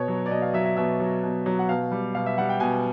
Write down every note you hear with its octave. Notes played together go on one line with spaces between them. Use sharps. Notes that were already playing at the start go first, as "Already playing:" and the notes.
Already playing: B2 C#5
F#3
D5
B2 D#5
F5
F#3 E5
E5
B2 E5
F#3
B2
F#3
F#5
B2 F5
G3
B2 F5
E5
G3 F#5
G5
B2 G#5